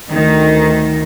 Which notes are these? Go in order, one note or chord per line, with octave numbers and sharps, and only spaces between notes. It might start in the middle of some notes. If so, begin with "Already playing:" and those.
D2 D#3